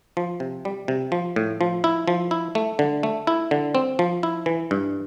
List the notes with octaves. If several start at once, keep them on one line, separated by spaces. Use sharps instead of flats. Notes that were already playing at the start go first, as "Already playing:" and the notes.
F3
C3
G3
C3
F3
A2
F3
E4
F3
E4
A3
D3
A3
E4
D3
C4
F3
E4
E3
G2